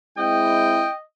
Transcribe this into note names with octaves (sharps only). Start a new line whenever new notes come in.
G#3 C4 E4 D#5 G5